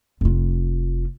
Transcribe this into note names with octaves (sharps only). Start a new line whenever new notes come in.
F1 F4